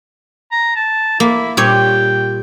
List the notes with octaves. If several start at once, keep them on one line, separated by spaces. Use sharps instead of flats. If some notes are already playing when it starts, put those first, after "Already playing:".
A#5
A5
A#3 E4
A#2 G3 C#5 G5